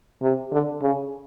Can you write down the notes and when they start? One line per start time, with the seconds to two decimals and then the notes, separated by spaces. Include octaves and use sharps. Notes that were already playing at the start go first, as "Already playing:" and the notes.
0.22 C3
0.51 D3
0.82 C#3